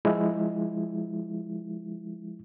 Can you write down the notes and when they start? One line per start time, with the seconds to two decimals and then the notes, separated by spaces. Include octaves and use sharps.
0.05 F3 G#3 E4